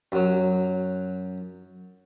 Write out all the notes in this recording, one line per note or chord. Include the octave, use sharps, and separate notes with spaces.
F#2 F#3